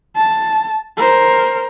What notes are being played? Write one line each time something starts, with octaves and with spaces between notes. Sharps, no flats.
A5
A#4 C5